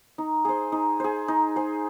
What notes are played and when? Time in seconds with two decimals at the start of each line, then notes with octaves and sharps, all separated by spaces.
0.18 D#4
0.45 G#4 C5
0.72 D#4
1.00 G#4 C5
1.28 D#4
1.56 G#4 C5